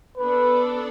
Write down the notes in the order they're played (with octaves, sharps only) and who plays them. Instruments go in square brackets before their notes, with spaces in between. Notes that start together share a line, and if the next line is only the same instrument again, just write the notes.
[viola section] B3 D4 A4 D5 [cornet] B4